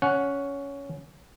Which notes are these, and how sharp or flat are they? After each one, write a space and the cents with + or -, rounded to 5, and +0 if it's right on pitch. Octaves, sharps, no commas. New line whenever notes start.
C#4 +10 F#5 -5